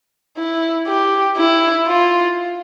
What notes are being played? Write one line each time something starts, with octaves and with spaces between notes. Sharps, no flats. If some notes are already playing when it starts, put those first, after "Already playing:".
E4
G4
E4
F4